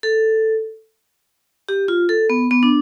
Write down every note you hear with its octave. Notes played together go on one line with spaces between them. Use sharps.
A4
G4
F4
A4
B3
B3
D4